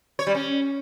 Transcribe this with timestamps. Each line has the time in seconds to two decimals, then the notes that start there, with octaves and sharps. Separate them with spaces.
0.19 C#5
0.27 G3
0.35 C#4